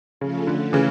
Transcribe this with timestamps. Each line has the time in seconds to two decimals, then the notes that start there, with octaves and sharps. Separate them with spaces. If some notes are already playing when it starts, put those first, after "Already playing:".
0.20 C#3 F3 A3 C#4 F4 A4
0.47 D3
0.73 C#3 E3